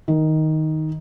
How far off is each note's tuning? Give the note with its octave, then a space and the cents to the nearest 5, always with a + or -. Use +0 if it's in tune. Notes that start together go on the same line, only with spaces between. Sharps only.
D#3 +5